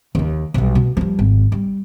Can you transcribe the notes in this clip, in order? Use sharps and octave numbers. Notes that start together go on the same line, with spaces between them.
D#2 D#3
B1 G3
B2
F3 G3
G#1
G3